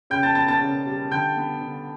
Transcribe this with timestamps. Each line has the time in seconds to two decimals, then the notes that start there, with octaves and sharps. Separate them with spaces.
0.10 C#3 G5 G6
0.23 A5 A6
0.35 B3 A5 A6
0.48 A5 A6
0.61 C#3
0.86 G3
1.11 D3 G5 G6
1.37 B3
1.61 D3